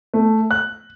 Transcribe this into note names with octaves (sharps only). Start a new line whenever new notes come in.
A3
F#6